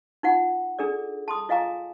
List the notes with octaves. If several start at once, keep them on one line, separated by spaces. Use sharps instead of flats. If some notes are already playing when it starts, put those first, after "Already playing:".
D#4 F4 F#5
D4 G#4 A4 D5
A5 C6 D#6
F4 D#5 F5 G#5 A#5 D6